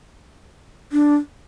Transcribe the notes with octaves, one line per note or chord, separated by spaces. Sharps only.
D4